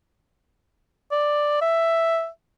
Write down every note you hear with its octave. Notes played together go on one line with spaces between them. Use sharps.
D5
E5